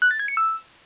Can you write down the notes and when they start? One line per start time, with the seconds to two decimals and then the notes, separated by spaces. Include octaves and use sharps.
0.02 F#6
0.11 A6
0.19 G#6
0.28 C#7
0.37 E6